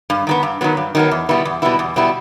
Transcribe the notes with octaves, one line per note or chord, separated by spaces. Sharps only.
G2
D#3 F#3 B3
G2
D#3 F#3 B3
G2
D#3 F#3 B3
E2
B2 G3 B3 E4
E2
B2 G3 B3 E4
E2
B2 G3 B3 E4